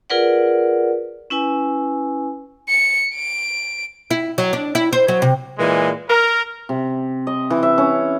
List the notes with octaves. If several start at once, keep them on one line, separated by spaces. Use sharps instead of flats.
F4 G#4 A#4 B4 D5 F#5
C#4 E4 B4 G#5
C#7
D7
E4
F#3
D4
E4
C5
F#3
C3
A#2 E3 G#3
A#4
C3
D#5
E3
E5
C#4